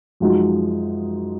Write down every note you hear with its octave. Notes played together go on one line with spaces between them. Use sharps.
F#2 F3 G#3 D#4 F#4